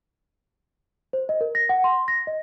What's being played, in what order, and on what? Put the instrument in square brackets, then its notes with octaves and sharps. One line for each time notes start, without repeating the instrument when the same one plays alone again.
[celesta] C5
D#5
A#4
A#6
F#5
C6
A#6
D#5